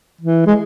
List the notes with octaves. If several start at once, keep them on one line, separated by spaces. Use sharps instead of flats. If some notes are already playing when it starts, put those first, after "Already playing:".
E3
G#3